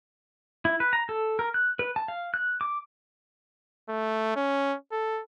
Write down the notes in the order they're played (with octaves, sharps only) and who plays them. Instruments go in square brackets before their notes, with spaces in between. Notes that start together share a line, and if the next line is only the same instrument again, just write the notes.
[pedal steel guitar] E4
B4
A#5
A4
A#4
F#6
B4
A5
F5
F#6
D6
[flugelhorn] A3
C#4
A4